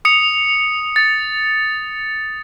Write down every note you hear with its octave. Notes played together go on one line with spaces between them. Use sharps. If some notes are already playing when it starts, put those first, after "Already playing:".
D#6 C#7 F7
A6 C#7